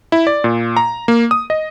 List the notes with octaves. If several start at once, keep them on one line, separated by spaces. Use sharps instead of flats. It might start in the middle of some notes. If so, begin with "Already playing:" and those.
E4
D5
A#2
A#5
A#3
D#6
D#5